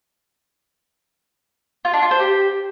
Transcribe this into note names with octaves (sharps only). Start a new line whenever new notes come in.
F4
D4
F4
C5
G4